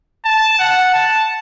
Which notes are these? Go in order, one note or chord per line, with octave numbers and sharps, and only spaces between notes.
A5
F#5
A5